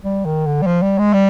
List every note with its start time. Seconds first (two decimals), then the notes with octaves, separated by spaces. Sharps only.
0.05 G3
0.25 D#3
0.46 D3
0.62 G3
0.66 F3
0.82 G3
0.99 G#3
1.14 G3